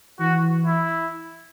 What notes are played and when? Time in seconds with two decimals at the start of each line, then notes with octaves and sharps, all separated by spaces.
0.19 E3 F#4
0.66 E4